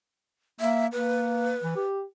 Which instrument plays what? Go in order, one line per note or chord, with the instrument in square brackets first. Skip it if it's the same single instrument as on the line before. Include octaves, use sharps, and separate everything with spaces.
[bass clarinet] A#3 [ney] E5
[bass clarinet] A#3 [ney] B4
[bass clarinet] E3
G4